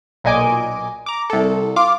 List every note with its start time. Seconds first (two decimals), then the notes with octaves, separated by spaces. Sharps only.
0.24 B1 A#2 D#5 G#5 D6 D7
1.06 A#5 D6
1.30 C2 A4
1.76 F4 F5 D6